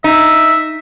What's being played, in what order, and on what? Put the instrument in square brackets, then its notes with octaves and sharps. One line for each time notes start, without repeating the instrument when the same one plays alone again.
[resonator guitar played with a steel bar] D#4 [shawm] E5